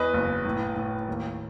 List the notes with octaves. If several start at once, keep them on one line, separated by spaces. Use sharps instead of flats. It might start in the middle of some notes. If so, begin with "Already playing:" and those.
Already playing: E2 B4 D#5
F#1
A2
A2
D#2